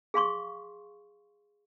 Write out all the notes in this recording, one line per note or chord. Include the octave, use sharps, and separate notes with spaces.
G#4 F5 C6 C#6